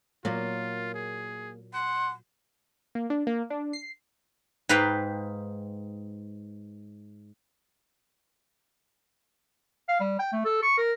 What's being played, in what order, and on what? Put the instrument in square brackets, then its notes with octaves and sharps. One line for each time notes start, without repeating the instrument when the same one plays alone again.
[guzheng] A#2 F#3 [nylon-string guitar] A#3 [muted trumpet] F4
[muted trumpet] G#4
[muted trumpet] F#5 [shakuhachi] C6
[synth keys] A#3
D4
A#3
D4
C7
[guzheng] G#2 B4 F5 G5
[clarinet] F5
G3
G5
A3
A4
C#6
A#4